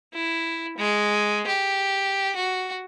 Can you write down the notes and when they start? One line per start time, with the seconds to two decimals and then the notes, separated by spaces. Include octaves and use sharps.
0.14 E4
0.78 G#3
1.47 G4
2.36 F#4